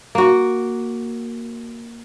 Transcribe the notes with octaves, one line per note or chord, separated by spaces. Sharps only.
A#3 F#4